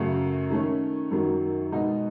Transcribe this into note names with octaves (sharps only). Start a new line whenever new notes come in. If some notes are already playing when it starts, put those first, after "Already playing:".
Already playing: F#2 C#3 F#3 A3
D#3 A3 C#4
F#2 D#3 F#3
B2 G#3 D#4